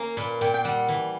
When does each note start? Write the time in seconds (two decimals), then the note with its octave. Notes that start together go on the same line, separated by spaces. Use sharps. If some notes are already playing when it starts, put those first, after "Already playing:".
Already playing: A#3 C#4
0.17 A#2 B4
0.41 A#2 G5
0.54 G5
0.64 G3 F#5
0.88 E3